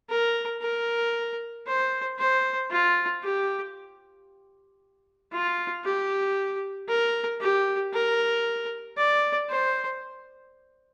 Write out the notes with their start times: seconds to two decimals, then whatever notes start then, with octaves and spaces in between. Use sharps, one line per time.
0.10 A#4
0.61 A#4
1.66 C5
2.19 C5
2.71 F4
3.23 G4
5.32 F4
5.84 G4
6.88 A#4
7.41 G4
7.93 A#4
8.97 D5
9.49 C5